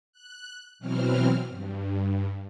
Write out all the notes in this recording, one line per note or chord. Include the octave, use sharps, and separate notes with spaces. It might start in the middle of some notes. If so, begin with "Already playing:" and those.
F#6
B2 E3 F#3 C4 F6
G2